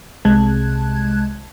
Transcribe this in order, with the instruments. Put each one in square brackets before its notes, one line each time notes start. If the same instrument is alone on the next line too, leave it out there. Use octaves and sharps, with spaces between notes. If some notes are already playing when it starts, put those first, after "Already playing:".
[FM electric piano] C2 C3 G#3 A5 F#6 G#6